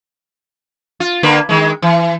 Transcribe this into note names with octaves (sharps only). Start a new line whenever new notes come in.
F4
D3 A#3 B4
D#3 G#3
E3